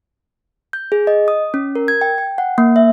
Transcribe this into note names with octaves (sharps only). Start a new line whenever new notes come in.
G6
G#4
D#5
D#6
C#4
A#4
G#6
G5
G5
F#5
A#3
E5